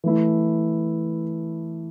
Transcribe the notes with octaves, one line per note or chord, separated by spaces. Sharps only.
E3 A3 E4